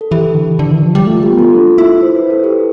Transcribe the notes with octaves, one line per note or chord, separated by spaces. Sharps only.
A4
E3 G4
D3
D3
E3
F3
G3
A3 F4
G4
B3
F4 A4
D4
E4
C5
B4
A4
G4 B4